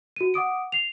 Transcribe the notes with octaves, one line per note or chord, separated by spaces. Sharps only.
F#4 D#7
F#5 D6 D#6 D7
C7 F7